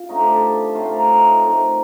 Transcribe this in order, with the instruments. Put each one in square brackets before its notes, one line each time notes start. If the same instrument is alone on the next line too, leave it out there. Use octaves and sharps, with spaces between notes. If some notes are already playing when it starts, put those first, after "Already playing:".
Already playing: [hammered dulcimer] F4
D3 A3 C4 D#4
G4
A4
A2 A3 C4 F4
A#4
D#4
D#3 A3 C4